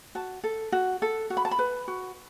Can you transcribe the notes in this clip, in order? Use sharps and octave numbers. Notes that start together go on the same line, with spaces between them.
F#4 A5
A4
F#4
A4
F#4
B5
A5
B5
B4
F#4